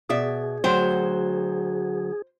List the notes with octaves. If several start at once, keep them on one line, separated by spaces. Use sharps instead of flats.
B2 G#4 D5 E5
D2 F#3 C5 G5